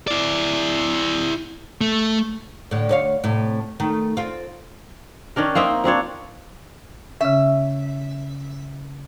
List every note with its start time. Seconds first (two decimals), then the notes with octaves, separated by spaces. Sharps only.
0.08 E4 D5
1.81 A3
2.71 A2 D3
2.89 D2 C#5 F5
3.24 A2 C3
3.80 D#3 A3
4.17 C4 F4
5.36 D#3 C#4 D4 A#4
5.55 A#3 C4 D#4 E5
5.84 F3 C4 D4 C#5
7.21 C#3 C#4 E5